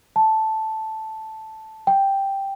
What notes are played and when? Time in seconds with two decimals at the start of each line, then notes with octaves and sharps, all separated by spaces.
0.16 A5
1.87 G5